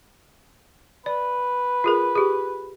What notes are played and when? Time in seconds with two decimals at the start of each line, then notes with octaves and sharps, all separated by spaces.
1.06 B4 D5
1.84 F4 G#4 A#4
2.15 G4 G#4